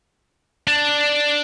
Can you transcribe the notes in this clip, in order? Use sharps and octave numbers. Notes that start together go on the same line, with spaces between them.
D4